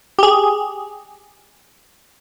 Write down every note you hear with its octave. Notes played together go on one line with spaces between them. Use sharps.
G4 G#4